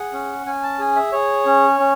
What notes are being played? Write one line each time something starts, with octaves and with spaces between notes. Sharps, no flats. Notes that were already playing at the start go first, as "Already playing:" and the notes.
Already playing: G#4 F#5
C#4
C#4 G#5
A5
G#4 G#5
E5
G#4 C#5
C#4
C#4